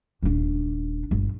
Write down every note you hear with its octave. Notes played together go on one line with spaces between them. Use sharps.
D#1 D4
G1